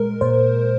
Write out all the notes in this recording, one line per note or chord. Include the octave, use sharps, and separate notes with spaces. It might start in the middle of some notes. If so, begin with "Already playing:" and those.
Already playing: A#2 G#3 A#4
A#2 C5